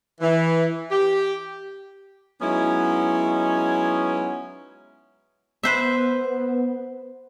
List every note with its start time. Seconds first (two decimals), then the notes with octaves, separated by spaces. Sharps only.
0.21 E3
0.91 G4
2.42 F#3 G#3 B3 C#4 D#4 E4
5.63 B3 B4 C5 E5